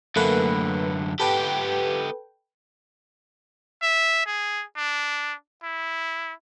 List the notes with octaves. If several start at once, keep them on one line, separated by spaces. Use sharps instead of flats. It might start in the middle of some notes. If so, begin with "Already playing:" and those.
F#2 D3 A3 A#3 B4
B3 G4 A4 B4 G5
E5
G#4
D4
E4